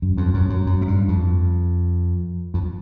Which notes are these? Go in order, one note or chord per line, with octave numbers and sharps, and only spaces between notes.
F#2
F2
F#2
F#2
F#2
G#2
G2
F2
F2